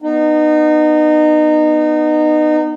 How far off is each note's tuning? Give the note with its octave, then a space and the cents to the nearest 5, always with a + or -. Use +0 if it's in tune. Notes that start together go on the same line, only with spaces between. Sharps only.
B3 +0 D#4 -25